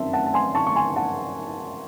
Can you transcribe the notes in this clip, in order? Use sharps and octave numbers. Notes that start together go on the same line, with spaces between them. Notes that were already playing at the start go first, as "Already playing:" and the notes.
Already playing: F#2 D#3 C4 E5 A5 C6
F#5 A5
A5
G#5 C6
A5 C#6
C#6
G#5 C6
F#5 A5